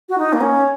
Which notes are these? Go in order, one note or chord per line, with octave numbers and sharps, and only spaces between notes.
F#4
D#4
A#3
C#4